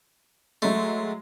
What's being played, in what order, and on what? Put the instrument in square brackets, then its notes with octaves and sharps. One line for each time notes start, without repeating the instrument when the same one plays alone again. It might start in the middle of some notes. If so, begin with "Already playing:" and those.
[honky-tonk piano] F#3 G#3 [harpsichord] A3